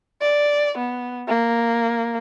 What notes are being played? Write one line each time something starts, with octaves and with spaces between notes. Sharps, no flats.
D5
B3
A#3